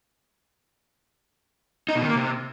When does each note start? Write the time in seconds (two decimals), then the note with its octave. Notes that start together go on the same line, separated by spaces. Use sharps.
1.89 D#4
1.95 B2
2.02 D#3
2.09 A#3
2.16 C3